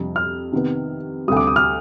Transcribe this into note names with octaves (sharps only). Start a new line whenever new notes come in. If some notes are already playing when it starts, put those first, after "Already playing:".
Already playing: F2 C3 G3 D4
F6
C3 D#3 B3
D2 C3 G3 D#6
D6
D#6
F6